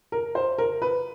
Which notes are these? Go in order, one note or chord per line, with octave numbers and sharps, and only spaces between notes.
A#4
C5
A#4
B4